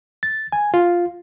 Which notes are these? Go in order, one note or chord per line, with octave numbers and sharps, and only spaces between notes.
A6
G#5
F4